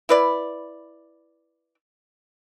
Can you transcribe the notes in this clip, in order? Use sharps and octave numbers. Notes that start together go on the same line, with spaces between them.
E4 B4 D5